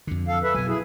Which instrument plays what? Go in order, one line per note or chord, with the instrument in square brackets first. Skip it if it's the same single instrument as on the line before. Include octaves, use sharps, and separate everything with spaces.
[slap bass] F2 D3
[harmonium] A4 F5
A4 B4 E5
[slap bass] B2 F#3 [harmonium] G#5
[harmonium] E4 G#4